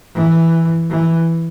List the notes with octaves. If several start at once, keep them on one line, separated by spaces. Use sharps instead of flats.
E3
E3